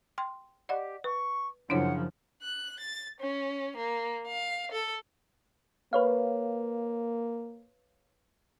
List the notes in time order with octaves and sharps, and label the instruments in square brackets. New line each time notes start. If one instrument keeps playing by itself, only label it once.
[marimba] G5 C6
[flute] G4 [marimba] D5 D#5 F#5
[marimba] B4 [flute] C#6
[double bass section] F#2 C#3 F3 [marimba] D4 E4 C#5 [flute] F#5
[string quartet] F#6
A6
C#4
A#3
F5
A4
[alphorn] A#3 [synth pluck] B4 C#5 F5